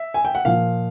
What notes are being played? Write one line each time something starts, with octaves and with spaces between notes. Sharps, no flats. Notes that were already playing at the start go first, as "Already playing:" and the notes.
Already playing: E5
G#5
G5
F#5
A#2 F3 F5